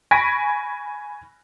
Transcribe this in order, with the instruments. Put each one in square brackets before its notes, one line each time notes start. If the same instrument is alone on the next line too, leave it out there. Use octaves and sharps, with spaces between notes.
[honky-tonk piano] G#5 B5 C#6 A#6 B6 D7